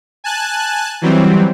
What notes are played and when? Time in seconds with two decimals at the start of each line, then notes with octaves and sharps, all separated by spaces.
0.24 G#5 A5 F#6
1.02 E3 F#3 G3 C4